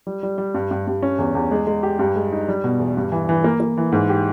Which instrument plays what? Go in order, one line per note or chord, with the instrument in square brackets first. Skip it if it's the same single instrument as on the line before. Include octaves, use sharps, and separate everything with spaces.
[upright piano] G3
G3
G3
G2
G2
G2
C#4
E2
E2
G#3
G#3
G4
G2
G#3
D#4
G3
B2
E2
G2
E3
E3
A#3
A#3
E3
G#2
G4